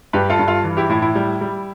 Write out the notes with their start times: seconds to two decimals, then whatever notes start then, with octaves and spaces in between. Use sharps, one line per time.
0.13 G2 G4 B4
0.30 F4 A4
0.39 G2
0.48 F4 A4
0.64 E3
0.77 E4 G4
0.89 A2 E4
1.02 E4
1.15 G3
1.41 G3